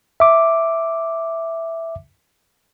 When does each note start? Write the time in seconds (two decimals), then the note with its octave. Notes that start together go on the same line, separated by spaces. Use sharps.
0.20 E5 D6